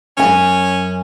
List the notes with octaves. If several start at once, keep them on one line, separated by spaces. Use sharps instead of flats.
F#2 C#4 G#5